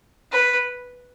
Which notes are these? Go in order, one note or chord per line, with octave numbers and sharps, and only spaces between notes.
B4